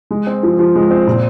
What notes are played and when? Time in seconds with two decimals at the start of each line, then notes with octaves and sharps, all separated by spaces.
0.11 G#3
0.27 C4
0.43 F3
0.59 F3
0.75 G#3
0.91 C4
1.07 A#2